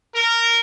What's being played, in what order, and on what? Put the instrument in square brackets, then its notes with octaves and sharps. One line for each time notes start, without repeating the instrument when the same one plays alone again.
[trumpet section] A#4